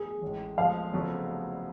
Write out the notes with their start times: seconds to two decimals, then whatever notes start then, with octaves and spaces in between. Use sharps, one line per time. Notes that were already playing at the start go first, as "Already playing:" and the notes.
Already playing: G#4
0.21 A1 A2 G#3
0.58 F2 F3 G#3 F5
0.92 F1 F2 C#3 F#3 B3